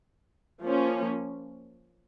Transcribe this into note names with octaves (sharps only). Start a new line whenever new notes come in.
F3 A#3 C#4